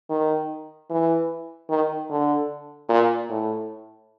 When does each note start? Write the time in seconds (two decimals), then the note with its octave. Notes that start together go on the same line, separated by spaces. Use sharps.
0.10 D#3
0.90 E3
1.69 D#3
2.10 D3
2.89 A#2
3.29 A2